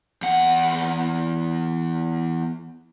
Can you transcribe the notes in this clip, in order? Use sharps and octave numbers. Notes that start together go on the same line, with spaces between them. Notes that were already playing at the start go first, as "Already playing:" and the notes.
E2 F#5